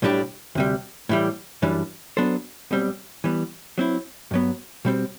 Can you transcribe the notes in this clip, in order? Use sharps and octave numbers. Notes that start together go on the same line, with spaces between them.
B1 A2 G3 D4 G4
D2 C3 G3
A2 E3 G3
F#2 E3 G3 D4
F#3 B3 D4 A4 C5
B1 B2 G3 C4
E3 G3 B3
F#3 C4 E4
G2 F#3 B3
B2 G3 C4